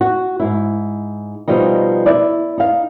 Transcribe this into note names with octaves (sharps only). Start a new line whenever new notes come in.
F#4
G#2 E4
B2 F3 G3 D#4
E4 D5
D#4 F5